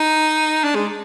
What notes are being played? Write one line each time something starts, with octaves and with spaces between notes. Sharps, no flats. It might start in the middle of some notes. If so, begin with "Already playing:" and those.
Already playing: D#4
D4
G#3